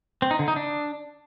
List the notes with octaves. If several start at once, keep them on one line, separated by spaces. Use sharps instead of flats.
C4
D#4
D3
D#4
D4